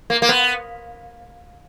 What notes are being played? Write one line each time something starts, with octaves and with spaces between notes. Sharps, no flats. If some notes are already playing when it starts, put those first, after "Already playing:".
A#3
A#3
B3